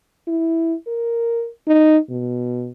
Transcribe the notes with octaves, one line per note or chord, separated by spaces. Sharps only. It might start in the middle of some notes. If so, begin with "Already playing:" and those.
E4
A#4
D#4
B2